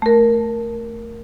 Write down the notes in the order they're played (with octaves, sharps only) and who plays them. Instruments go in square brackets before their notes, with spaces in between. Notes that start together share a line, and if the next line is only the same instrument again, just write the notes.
[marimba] A3 A#4